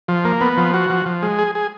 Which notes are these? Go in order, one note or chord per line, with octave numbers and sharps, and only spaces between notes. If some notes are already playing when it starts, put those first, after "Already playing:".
F3
A#3
B3
F3
F#4
F3
F3
G#3
G#4
G#4